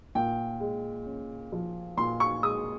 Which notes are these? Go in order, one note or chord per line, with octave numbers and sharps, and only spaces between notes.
A#2 G5
G#3
C#4
F3
A#2 C6
C#6
G#3 D#6